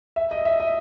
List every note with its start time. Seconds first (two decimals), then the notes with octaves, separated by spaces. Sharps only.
0.16 E5
0.31 D#5
0.45 E5
0.60 D#5